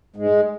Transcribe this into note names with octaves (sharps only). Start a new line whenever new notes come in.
G#2 G#3